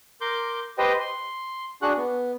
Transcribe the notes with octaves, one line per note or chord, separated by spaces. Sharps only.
A#4 C6 D6 G6
G4 B4 C5 D#5 G5
C6
D4 F#4 G#4 F#5 F#6
B3